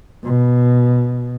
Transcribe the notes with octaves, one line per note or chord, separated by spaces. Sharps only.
B2